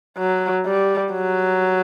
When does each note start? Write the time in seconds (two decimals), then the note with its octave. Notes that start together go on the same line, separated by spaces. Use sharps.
0.18 F#3
0.65 G3
1.12 F#3